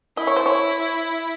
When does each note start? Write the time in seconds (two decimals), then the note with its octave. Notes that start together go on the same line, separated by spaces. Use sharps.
0.17 E4 D#5
0.27 C#5
0.36 C5
0.46 C#5